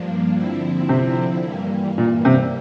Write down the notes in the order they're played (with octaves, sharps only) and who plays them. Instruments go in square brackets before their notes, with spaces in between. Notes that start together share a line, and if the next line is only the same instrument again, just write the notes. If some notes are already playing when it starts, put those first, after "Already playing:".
Already playing: [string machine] G2 F3 A#3 D4
D3 F3 C4 E4
[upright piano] C3
[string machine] G2 E3 G3 A#3
[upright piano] A#2
C3